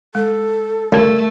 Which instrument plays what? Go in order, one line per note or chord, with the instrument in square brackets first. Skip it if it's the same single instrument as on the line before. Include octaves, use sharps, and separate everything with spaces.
[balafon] G#3 [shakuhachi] A4
[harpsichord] D2 C#3 G3 [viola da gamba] A3 [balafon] A#4 A5